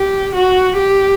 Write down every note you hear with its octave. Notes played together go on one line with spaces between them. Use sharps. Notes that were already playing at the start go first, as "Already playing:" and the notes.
Already playing: G4
F#4
G4